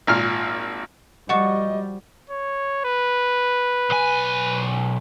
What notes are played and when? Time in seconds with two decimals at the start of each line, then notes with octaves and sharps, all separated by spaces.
0.07 G#1 A#2 F6
1.29 F3 G3 F#4 D#5 F#5 A5 C#6
2.30 C#5
2.85 B4
3.90 B1 G#5